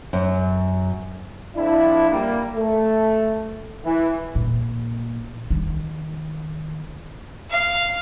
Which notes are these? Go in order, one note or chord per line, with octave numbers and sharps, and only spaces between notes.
F#2
F2 D4 E4
G3 A#3
A3
E3
A#2
D#3
F5